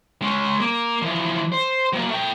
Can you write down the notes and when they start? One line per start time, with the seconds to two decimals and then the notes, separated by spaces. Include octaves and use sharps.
0.22 G#3 C#4
0.60 A#3
1.02 E3 F3
1.52 C5
1.93 F#3 A#3
2.09 A3 G5